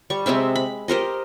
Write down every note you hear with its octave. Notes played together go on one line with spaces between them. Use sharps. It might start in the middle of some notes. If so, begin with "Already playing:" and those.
G3 C#6
C3 G#3 C4 E5
B5
G4 A#4 C5 D#5